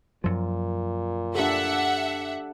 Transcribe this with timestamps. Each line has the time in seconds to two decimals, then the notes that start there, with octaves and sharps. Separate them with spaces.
0.24 F#2 A#2 F3
1.35 D4 G4 A4 E5 F#5